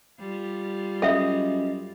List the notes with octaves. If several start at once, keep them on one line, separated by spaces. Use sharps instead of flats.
G3 F4
F#2 A4 D#5 E5